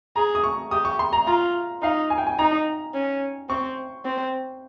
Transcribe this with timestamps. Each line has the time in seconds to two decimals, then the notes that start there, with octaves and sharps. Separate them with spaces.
0.16 G#4 A#5
0.35 D#6
0.44 C#6
0.71 G4 D#6
0.85 C#6
0.99 C6
1.13 A#5
1.27 F4 A#5
1.82 D#4 F5
2.10 G#5
2.18 G5
2.27 G#5
2.39 D#4 A#5
2.94 C#4
3.49 C4 C#6
4.05 C4